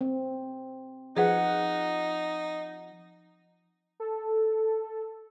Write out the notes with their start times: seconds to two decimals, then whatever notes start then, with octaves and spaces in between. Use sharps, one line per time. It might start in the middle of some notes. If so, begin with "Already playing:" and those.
0.01 C4
1.17 F3 D#4 G#4 B4 F#5
4.00 A4